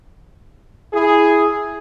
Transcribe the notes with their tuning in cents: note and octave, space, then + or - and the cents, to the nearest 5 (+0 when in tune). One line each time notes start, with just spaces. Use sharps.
E4 +0 G#4 +0